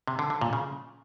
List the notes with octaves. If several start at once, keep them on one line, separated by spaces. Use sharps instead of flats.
C3
D3
D3
A#2
C#3